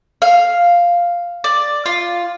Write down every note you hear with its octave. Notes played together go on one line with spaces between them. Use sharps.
F5
D5
F4